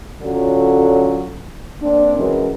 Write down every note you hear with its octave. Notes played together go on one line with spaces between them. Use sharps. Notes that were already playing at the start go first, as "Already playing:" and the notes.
D3 F#3 C#4 F4 A4
A#3 C4 D4
E3 F#3 G#3 C#4 A#4